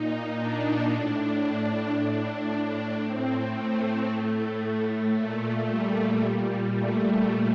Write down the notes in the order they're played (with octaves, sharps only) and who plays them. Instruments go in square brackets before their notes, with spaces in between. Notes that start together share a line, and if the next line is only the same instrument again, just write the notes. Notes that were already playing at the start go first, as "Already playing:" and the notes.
Already playing: [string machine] A#2 D#4
D4
A2
A2 D4
D4
A2 C4
A3
A2
A#2 A3
G3
A#2 G3
A3